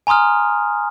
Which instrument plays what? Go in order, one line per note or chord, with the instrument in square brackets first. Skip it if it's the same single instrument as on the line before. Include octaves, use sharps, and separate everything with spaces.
[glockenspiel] G#5 A#5 C6 D#6 F6